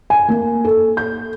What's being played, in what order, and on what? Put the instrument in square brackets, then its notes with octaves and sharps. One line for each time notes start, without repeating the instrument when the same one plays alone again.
[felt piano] G#5
A#3
A4
G6